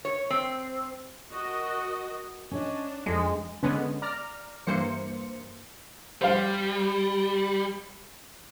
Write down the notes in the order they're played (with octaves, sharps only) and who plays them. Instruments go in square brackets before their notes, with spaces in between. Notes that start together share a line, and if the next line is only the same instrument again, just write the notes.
[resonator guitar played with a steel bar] C#5
C4
[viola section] F#4 A#4 D#5
[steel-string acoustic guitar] C#4 D#5 [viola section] D4
[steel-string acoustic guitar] F2 D#4 A4 [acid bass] G#3
[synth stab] D3 G#3 B3 C#4
D5 A#5 F6
G2 E3 A#3 C5 C#7
[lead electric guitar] G3 [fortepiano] C5 F5